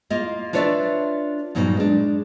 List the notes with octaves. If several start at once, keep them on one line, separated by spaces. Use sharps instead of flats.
A#3 F4 D#5
D4 F4 B4 C#5 D5 E5
G2 A#2 F#3 A#3 C#4 D#4
G#3 D4